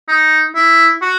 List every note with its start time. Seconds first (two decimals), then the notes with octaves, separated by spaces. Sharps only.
0.08 D#4
0.55 E4
1.02 F#4